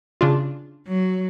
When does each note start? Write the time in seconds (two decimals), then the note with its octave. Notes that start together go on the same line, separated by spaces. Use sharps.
0.21 C#3 D4 F4
0.86 F#3